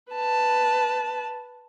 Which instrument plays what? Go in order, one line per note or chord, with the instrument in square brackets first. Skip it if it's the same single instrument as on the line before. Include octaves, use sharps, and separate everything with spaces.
[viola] B4 A5